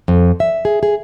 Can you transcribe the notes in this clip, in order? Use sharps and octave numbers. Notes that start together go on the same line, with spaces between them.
F2
E5
G#4
G#4